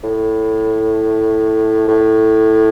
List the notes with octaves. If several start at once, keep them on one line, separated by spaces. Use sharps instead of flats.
A2
A2